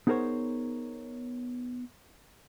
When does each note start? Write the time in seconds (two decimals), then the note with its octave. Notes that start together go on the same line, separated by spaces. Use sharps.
0.07 B3 D#4 G#4 A#4 C5 C#5